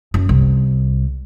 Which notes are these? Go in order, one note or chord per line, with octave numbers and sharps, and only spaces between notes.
F#2
C2